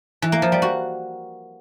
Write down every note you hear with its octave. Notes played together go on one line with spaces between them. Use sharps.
E3
A#3
F3
G3
F#4